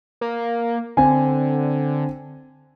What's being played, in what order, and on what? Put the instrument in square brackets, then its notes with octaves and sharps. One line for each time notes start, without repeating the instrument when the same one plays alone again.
[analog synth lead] A#3
[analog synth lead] D3 [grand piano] C4 G#5